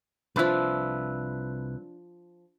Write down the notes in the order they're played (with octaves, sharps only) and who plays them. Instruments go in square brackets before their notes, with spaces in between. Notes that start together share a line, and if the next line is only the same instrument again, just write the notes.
[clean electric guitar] C2 B4 E5 [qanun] F3 D4